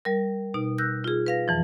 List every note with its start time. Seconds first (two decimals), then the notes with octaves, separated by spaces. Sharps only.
0.05 G3 A#4
0.54 B2 D#4
0.78 E6 F#6 G6 A#6
1.04 F4 G#4
1.26 B4 F5 A#6
1.48 F2 E3 F3